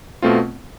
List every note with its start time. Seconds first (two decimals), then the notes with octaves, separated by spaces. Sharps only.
0.22 B2 A3 C4 F4